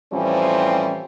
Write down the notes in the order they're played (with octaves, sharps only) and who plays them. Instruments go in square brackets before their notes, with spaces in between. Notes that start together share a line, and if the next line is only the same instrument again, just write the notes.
[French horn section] A2 E3 F3 G3 C4 C#4